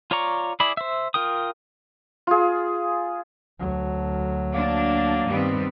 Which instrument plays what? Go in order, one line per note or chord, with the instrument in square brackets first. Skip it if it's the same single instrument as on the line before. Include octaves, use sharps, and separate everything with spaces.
[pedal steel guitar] F4 C#5 D5 A#5 C#6
E4 G#4 D5 B5
C5 E5
F4 A#4 G5 D#6
[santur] F4 G#4
[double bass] D2 F#3
[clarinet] A#3 [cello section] D4
[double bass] G2 D#3 [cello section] G3 B3 C4